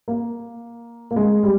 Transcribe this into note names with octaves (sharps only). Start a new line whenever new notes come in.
A#3
A#3
G#3
G3